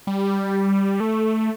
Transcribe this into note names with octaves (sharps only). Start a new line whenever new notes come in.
G3
A3